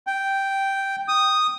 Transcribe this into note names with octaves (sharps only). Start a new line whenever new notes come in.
G5
D#6